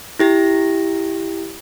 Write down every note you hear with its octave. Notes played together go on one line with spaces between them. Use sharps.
E4 G4 A#6